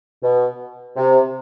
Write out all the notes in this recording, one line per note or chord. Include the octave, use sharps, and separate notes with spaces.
B2
C3